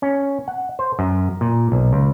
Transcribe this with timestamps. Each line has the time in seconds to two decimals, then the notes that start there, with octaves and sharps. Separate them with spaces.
0.02 C#4
0.48 F#5
0.79 C5
0.99 F#2
1.41 A#2
1.72 B1
1.93 C#2